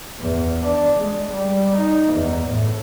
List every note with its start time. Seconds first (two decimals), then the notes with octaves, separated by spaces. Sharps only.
0.20 E2
0.64 D4
0.99 G#3
1.30 G3
1.76 D#4
2.13 E2
2.48 A2